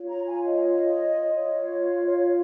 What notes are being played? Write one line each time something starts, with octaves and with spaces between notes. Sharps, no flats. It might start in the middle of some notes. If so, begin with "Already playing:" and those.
Already playing: F4 C#5
A#5
G#5
D#5
F4 C#5
C#5